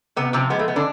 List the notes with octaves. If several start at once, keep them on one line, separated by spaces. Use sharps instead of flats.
C3 B3
C3 F3 C4
G#3 B3
A3
G#3 B3
D3 D4